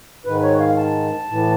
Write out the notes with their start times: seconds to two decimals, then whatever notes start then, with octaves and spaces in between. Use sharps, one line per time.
0.25 G#2 D#3 B4
0.42 C#5
0.60 F5
0.77 A5
1.29 A2 E3